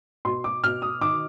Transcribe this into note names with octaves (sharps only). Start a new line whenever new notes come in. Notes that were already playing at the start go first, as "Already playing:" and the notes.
B2 C6
D6
B2 F6
D#6
D#3 D6